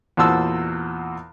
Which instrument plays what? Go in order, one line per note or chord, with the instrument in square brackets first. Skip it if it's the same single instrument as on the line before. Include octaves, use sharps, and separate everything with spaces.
[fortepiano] E2 A#2 F#4 C5 A5 E6